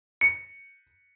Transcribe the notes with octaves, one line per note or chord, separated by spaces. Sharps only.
C#7